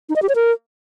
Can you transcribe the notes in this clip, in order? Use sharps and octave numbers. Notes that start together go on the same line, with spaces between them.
D#4
D#5
G4
C#5
A#4